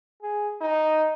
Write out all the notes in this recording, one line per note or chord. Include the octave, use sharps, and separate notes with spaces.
G#4
D#4